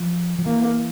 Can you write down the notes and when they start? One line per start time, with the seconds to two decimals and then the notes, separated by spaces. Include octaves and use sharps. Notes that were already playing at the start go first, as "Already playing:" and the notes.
Already playing: F3
0.39 F3
0.46 E3 A#3